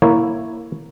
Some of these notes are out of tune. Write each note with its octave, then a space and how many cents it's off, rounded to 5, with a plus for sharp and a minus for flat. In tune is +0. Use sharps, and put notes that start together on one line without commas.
A#3 +0 E4 +0 C#5 +0